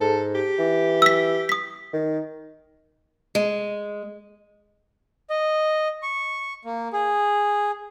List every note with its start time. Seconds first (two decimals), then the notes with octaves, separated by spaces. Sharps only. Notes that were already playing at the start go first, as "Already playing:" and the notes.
0.01 G#2 A4
0.35 G4
0.59 E3
1.02 E6 B6
1.49 D#6 B6
1.93 D#3
3.35 G#3
5.30 D#5
6.03 C#6
6.65 A#3
6.93 G#4